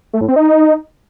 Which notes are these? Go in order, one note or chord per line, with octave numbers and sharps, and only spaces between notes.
A3
A2
C4
D#4